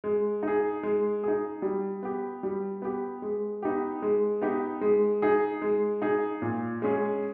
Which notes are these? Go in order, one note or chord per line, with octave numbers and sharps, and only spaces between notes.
G#3
D#4 G#4
G#3
D#4 G#4
G3
B3 G4
G3
B3 G4
G#3
B3 D#4 G4
G#3
B3 D#4 G4
G#3
D#4 G#4
G#3
D#4 G#4
A#2
G#3 C#4 G#4